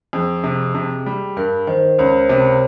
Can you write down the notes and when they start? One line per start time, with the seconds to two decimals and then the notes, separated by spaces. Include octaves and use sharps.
0.13 F2 G#4
0.44 C3
0.75 C3
1.06 G3
1.37 G2 A#4
1.67 D#3 C5
1.99 C#2 C#5
2.29 C3